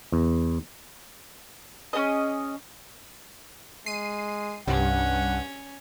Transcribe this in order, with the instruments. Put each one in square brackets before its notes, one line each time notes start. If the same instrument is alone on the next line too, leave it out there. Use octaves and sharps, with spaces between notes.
[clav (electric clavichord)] E2
[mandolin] C#4 F#4 G#4 D#5
[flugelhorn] G#3 [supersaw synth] C7 D#7
[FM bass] C2 [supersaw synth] G2 [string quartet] C#4 [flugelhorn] F#5